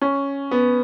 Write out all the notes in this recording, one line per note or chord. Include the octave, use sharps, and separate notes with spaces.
C#4
B3